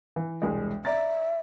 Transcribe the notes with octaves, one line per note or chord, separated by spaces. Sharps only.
E3
E1 C2 G#3
D5 E5 A#5 A6